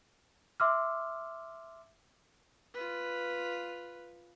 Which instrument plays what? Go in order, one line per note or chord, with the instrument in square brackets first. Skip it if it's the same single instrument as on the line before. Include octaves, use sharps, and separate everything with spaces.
[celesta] E5 C6 D6 E6 F6
[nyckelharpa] F4 B4